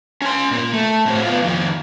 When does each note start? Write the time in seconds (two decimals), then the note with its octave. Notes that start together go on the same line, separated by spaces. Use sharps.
0.22 C#4 C6
0.52 A#2 A#3
0.73 A3
1.06 A2 C4
1.25 B3 F4
1.42 F2 D#3